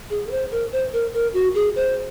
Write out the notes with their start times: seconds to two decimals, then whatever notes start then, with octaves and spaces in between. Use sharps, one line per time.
0.10 G#4
0.27 A#4
0.31 C5
0.52 A#4
0.72 C5
0.93 A#4
1.13 A#4
1.34 F#4
1.55 G#4
1.76 C5